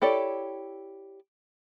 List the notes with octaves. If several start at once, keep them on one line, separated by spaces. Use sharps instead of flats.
E4 G4 A4 C#5 D5